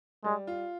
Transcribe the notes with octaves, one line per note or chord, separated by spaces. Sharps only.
G3 G#3
F4